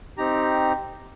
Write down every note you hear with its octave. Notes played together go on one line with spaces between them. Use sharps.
C4 D#4 G4 A#5